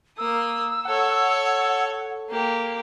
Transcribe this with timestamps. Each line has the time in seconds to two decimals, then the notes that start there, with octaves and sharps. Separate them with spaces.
0.18 A#3 D#6 E6
0.85 A4 C#5 F#5
2.29 A#3 G4